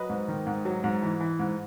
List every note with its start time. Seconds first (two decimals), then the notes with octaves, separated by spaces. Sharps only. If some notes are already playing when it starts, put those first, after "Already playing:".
Already playing: F#3 B4 D#5
0.10 G#2
0.28 D#3
0.46 G#2
0.65 F#3
0.84 G#2
1.02 E3
1.20 E3
1.39 G#2